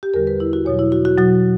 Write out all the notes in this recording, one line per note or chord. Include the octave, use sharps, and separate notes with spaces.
G4
E2 D3 G3 A#4
B4
E4
F#4
E2 B2 F#3 C#5
E4
F#4
F#4
B2 F#3 F#4